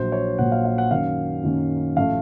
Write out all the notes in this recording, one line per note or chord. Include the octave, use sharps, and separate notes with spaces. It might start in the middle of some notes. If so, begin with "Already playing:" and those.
Already playing: A#1 A#2 F#3 C5
C#5
A#1 A#2 F#3 F#5
F5
F5
F#5
F#2 D#3 F#3 A#3 C#4 F5
F#2 D#3 F#3 A#3 C#4
A1 A2 F3 A3 F5